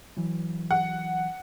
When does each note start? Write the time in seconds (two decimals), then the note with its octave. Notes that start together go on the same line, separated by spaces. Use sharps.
0.17 E3 F#3
0.71 F#5